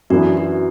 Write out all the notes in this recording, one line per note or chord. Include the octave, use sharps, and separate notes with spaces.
F#2 E3 B3 D4 F#4
F#4